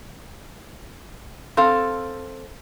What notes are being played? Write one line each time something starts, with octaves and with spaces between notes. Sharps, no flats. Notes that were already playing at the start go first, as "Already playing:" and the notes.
C4 A4 F5